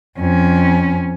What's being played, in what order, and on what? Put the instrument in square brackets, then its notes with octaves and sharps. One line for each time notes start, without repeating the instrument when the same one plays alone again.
[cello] F2 C#4